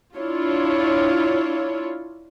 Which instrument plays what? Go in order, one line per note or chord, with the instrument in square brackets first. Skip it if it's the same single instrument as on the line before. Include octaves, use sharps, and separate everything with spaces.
[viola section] D4 E4 F4 C#5